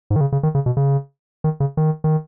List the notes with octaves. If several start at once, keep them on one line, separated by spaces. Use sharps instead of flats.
G#2
D#3
C#3
C#3
D#3
C#3
B2
C#3
D#3
C#3
D#3
D#3